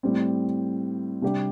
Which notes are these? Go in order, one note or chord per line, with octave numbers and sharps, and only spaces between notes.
A2 G3 C4
C3 G3 D4 G4